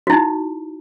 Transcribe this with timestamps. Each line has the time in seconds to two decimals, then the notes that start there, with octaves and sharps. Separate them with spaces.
0.07 F#4
0.10 E4
0.12 D#4